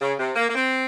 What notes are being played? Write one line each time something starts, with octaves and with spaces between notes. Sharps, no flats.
C#3
C3
A#3
A#3
C4